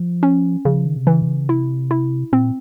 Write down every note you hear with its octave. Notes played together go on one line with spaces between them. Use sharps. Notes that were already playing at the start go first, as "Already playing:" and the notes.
Already playing: F3
C#4
C#3 F3
D#3
C3
C#3 E3
C3
C#3
C3 E4
E4
A#2 C4